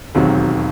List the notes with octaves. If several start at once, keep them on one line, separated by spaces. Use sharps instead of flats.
E1 D#2 D#3 F#3 C4